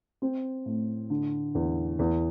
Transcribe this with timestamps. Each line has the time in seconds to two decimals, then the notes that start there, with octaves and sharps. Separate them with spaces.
0.22 C4
0.66 A2
1.10 D3
1.55 E2
1.99 E2